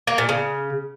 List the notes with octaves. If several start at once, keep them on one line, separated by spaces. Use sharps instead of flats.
A#3
A#2
C#3